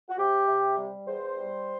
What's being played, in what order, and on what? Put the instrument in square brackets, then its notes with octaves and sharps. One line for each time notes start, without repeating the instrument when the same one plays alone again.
[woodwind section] F#4
C3 G4
C3
G3
E2 C5
G3